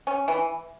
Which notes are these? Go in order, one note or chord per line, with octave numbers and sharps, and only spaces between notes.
C#4
E3